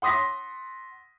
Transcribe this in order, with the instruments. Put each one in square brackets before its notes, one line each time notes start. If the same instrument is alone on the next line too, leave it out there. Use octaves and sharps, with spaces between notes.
[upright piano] F#5 C6 D#6 A#6 B6